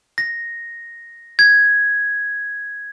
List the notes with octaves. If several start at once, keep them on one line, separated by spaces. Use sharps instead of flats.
A#6
G#6